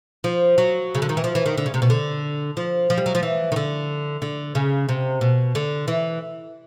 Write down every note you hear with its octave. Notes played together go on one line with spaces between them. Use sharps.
F3
F#3
C#3
D3
D#3
E3
F3
E3
D#3
D3
C#3
C3
B2
D3
F3
F3
G3
F#3
F3
E3
D#3
D3
D3
C#3
C3
B2
D3
E3